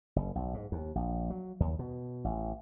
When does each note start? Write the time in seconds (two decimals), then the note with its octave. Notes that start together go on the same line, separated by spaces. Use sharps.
0.16 F#1
0.35 B1
0.54 G#2
0.72 D#2
0.95 A#1
1.30 F#3
1.60 D#2
1.79 B2
2.24 A1